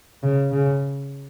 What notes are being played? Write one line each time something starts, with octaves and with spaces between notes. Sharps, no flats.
C#3
C#3